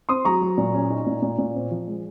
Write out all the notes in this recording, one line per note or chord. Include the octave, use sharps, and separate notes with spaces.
C4 C6 D#6
F#3 A#5 C#6
F#3
A#2
C#4
D#4
A#2
A#2
A#2
C4
F3
G#3